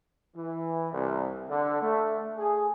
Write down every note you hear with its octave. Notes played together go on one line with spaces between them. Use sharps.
E3
C2
D3
A3
G#4